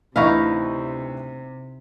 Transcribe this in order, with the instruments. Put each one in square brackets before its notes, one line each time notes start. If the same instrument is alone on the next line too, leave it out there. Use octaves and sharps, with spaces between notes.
[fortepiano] D2 E3 C#6 [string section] C3 [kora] D#4 E4 F5